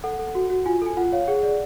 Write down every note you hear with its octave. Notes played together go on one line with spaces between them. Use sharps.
A4 F#5
A4
F#4
F#4
F4 G#5
A4 G#5
F4 F#5
C#5 F5
G#4 F#5
D5